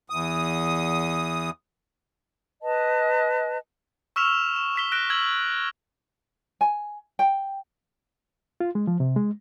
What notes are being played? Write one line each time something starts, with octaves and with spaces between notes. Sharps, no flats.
E2 D#6
B4 D#5 A5
C#6 E6 F6 B6 E7 F7
E7
E6 B6 G7
F#6 A#6 B6 D7 E7 G7
E6 G#6 B6 F#7
G#5
G5
F4
G#3
F3
C3
G#3